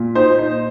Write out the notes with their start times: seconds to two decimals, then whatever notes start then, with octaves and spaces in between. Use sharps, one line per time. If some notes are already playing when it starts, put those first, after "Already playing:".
Already playing: A#2
0.15 D#4 C5
0.39 D#4